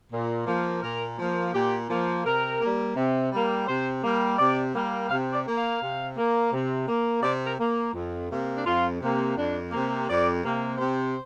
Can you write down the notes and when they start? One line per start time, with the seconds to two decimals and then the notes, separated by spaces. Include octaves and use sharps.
0.12 A#2
0.47 F3 A#3
0.82 A#2 A#4
1.19 F3 A#3
1.54 A#2 G4
1.90 F3 A#3
2.25 C3 A#4
2.61 G3 A#3
2.96 C3
3.32 G3 A#3
3.67 C3 C5
4.03 G3 A#3
4.39 C3 D5
4.75 G3 A#3
5.09 C3 F5
5.33 D5
5.46 A#3
5.57 F5
5.81 C3
6.17 A#3
6.52 C3
6.88 A#3
7.22 C3 D5
7.46 A#4
7.59 A#3
7.94 F2
8.30 C3 A#3
8.58 D4
8.65 F2 F4
9.01 C3 A#3
9.37 F2 D4
9.71 C3 A#3
10.08 F2 D5
10.43 C3 A#3
10.78 C3 C5